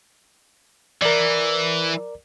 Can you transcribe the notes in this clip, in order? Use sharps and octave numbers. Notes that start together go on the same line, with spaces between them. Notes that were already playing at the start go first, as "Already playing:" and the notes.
E3 A#4 D5